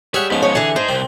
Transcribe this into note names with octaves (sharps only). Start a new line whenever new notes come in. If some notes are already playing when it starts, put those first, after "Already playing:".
G3 G#4 C#5 E5 F#5
G#2 F3 B3 C#4
C#5
D3 E3 G#4 A5
D#4 G#4 C5
C2 C4